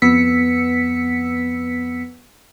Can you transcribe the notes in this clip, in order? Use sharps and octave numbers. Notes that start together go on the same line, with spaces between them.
F2 B3 E6 B6 C#7